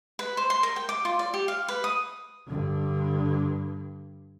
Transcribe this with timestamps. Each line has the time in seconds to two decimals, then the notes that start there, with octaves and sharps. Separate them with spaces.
0.19 B4
0.37 C5
0.50 C6
0.63 A#4
0.76 G5
0.89 D6
1.05 F4
1.19 D5
1.34 G4
1.48 F5
1.68 B4
1.84 D#6
2.46 G2 D3